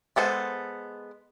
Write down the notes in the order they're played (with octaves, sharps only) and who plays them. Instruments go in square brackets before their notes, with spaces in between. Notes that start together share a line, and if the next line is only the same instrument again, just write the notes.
[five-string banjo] G#3 B3 A4 C5